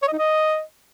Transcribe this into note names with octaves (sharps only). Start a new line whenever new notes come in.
C#5
D#5
D#4
D#5